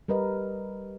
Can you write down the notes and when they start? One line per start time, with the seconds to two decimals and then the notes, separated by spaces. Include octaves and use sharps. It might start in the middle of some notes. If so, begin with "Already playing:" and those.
0.08 G3 A#4 B4 D#5